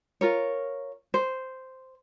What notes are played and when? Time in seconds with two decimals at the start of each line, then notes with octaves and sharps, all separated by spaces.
0.21 F4 A#4 C#5
1.14 C5